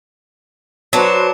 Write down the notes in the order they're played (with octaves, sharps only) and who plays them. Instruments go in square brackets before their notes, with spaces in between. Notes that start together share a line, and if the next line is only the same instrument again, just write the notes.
[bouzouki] F#3 D4 [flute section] F#4 B4 C5